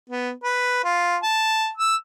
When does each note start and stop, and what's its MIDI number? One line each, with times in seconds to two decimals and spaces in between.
0.10 0.32 59
0.44 0.81 71
0.84 1.17 65
1.23 1.69 81
1.77 1.96 88